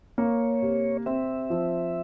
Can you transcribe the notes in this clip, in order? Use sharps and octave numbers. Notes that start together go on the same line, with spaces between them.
A#3 C#5
C3
C4 E5
F3